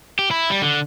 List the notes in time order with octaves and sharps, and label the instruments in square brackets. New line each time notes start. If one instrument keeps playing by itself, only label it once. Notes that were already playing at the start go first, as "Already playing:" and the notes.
[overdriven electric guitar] G4
E4
G3
D3